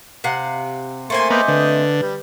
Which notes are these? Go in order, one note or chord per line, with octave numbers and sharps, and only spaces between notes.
C3 F5 F#5
A3 A#3 C4 G#5 C6
A#3 B3 D#5 C6 D6 G6
D3 B4
G3